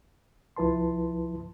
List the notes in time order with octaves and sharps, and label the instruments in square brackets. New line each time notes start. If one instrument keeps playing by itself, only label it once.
[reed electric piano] C2 F3 E4 B4 A5 C6